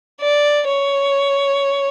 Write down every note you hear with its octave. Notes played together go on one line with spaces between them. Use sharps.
D5
C#5